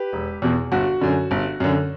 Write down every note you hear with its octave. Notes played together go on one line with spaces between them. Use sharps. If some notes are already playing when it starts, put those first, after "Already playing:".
Already playing: G4 B4
E1
E2 B2
G1 F#4
F#2 D3
G1
F#2 D3